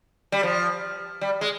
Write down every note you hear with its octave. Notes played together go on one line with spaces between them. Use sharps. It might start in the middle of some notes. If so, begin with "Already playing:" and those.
G3
F3
G3
G#3